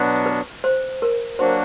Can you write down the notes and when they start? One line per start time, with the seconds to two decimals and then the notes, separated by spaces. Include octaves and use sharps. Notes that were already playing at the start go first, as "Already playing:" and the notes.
Already playing: B2 F#3 B3 D4 F#4
0.26 B4
0.64 C5
1.02 A#4
1.39 F#3 A#3 D4 F#4 C5